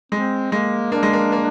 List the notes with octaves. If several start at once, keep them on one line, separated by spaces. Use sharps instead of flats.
G#3 C4
G#3 A#3
A#3 D4
G#3
A#3
A#3